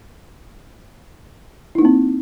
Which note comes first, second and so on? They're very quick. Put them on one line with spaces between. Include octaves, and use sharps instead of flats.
E4 D#4 A#3 C4